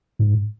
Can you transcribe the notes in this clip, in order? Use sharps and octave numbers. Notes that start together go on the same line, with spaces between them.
G#2